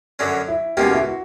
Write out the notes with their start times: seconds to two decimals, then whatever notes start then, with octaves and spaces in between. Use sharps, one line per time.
0.19 F#2 D3 F#3 C#4
0.48 E4
0.77 C#2 B2 A#3 C#4 G4
0.85 F#4
0.93 E4
1.01 F#4